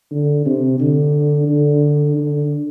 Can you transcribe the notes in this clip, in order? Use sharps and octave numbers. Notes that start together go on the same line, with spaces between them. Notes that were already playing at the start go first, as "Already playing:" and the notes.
D3
C3
D3
D3
D3